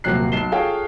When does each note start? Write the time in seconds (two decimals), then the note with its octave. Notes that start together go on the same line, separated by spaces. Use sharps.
0.04 D#1 C3 F#3 A#3 F#6 C7
0.32 B1 C7 E7 G7
0.52 F4 G#4 A4 C#5 F5 G5